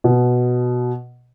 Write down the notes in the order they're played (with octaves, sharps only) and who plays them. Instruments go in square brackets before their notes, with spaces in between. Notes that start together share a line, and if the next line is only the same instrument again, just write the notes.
[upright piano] B2